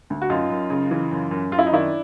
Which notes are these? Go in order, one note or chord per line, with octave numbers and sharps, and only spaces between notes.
D2
F#4
F#2 D#4 F4
F#2
C#3
E3
F#2
F#2
F#2 F4
E4
D#4
D#3 D4 E4